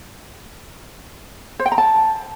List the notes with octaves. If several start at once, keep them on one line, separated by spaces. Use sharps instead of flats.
C5
G5
A#5
A5